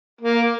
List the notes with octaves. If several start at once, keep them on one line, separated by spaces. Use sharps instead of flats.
A#3